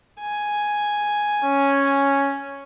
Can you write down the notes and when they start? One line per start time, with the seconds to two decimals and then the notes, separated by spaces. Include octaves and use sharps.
0.20 G#5
1.45 C#4